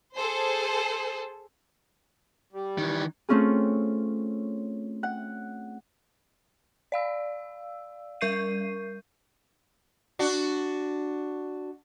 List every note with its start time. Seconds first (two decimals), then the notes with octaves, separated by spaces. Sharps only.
0.15 G#4 A4 C5
2.53 G3
2.78 D#3 E3
3.29 A3 C4 C#4 F4 G#4
5.03 F#5
6.92 D5 F5 E6
8.21 G3 A#4 C#6 G6 C7 D#7
10.19 D4 F#4